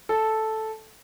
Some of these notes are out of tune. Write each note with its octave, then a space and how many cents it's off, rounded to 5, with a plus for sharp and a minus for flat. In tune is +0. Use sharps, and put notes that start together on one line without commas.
A4 -5